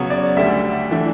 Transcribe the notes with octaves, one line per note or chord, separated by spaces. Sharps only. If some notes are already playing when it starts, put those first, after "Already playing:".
Already playing: C#3 F#3 B3 C#5
D5
D2 D3 G3 E5
E3 A3 D4